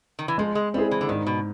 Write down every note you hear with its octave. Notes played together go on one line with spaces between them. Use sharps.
D#3
E3
F3 G#3
G#3
G3 C4 E4 G#4
E3
D3
G#2 D#3
B2